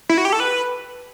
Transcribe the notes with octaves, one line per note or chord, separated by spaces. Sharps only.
E4
F#4
G4
A4
B4